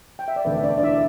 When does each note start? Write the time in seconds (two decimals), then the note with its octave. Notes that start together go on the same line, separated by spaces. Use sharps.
0.19 G5
0.28 E5
0.36 D5
0.45 E1 D2 D3 A3 B4
0.57 E5
0.63 D4 D5
0.78 D5
0.83 E4 E5